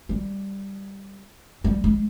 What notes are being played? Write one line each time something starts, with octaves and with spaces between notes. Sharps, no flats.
G3
G3
G#3